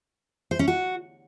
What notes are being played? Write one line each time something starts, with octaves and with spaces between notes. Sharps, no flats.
C5
C#4
F#4